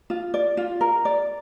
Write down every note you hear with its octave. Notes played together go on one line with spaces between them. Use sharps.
F4
D5
F4
A#4
D5